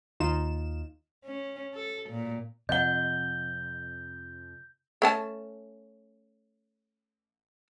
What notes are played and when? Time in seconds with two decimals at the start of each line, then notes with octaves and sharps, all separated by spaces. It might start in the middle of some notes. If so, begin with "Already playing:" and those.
0.20 D#2 D#4 F4 E7
1.25 C#4
1.74 A4
2.10 A#2
2.69 F2 C3 F3 D#5 F#5 G6 G7
5.02 A3 C#4 A5